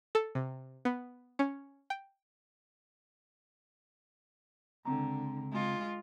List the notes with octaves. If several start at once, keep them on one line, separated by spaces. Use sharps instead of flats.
A4
C3
B3
C#4
G5
C#2 D3 C4 A#5
G#3 F4